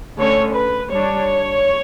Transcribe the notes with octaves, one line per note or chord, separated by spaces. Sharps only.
D3 A3 C#4 C#5
B4
G3 D4 C#5